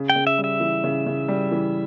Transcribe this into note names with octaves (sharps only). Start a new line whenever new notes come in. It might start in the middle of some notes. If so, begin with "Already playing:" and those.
Already playing: C#3
G5
C#3
E5
G3
E5
E3
C#3
C#3
G3
E3